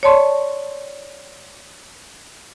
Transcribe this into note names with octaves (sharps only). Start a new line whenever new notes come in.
C#5 D5 A5 C6 C#6